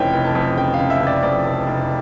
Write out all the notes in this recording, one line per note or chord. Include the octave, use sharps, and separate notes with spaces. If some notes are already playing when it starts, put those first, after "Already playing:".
Already playing: F1 F2 C#3 E3 C#5 G5
F1
A5
F2
C#3 G5
F5
C#3
E5
C#3
D5
F2 D5
F1
F1